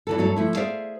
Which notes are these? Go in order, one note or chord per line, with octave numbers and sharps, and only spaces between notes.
E2 E3 A4
G2 F#3 A3 A4
F3 A3 E4
G#4 C5 D5 E5 F5